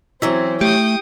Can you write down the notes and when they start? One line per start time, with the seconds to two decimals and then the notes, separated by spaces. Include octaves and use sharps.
0.22 E3 F#3 C4 C#4 E4
0.61 A3 G4 G5 D#6